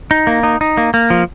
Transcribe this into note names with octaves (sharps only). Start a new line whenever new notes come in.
D#4
A#3
D#4
D#4
A#3
A#3
F3